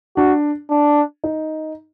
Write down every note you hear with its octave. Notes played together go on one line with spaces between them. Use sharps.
D4 F#4
D4
D#4